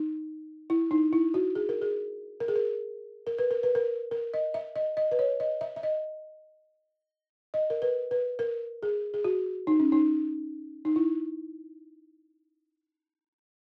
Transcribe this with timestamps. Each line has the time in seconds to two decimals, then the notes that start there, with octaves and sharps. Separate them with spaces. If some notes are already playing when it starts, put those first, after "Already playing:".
Already playing: D#4
0.70 E4
0.91 D#4
1.13 E4
1.34 F#4
1.55 G#4
1.69 A#4
1.82 G#4
2.40 A#4
2.48 G#4
2.56 A#4
3.27 A#4
3.39 B4
3.51 A#4
3.63 B4
3.75 A#4
4.11 A#4
4.34 D#5
4.54 E5
4.76 D#5
4.97 D#5
5.11 B4
5.19 C#5
5.40 D#5
5.61 E5
5.76 E5
5.83 D#5
7.54 D#5
7.70 A#4
7.82 B4
8.11 B4
8.39 A#4
8.83 G#4
9.14 G#4
9.24 F#4
9.67 D#4
9.80 C#4
9.92 D#4
10.85 D#4
10.96 E4